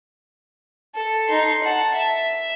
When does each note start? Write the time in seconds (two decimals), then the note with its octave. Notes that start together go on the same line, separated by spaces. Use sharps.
0.95 A4
1.28 D#4 C6
1.63 F#5 A5
1.94 E5